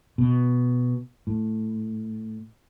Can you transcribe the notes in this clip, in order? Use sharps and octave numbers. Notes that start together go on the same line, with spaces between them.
B2
A2